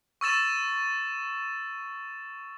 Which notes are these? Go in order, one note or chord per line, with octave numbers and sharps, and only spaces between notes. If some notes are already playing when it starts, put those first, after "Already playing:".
C#6 E6 A6 E7